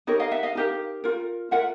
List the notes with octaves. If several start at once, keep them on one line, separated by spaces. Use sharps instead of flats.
D#4 G4 A#4 C#5 D#5
D#5 F5
E5 F#5
D#5 F5
D#4 G4 A#4
F4 A#4
F4 A#4 E5 F#5